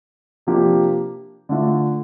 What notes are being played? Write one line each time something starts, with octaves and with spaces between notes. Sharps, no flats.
C3 F3 A#3 D4 G4
D3 A3 D4 F4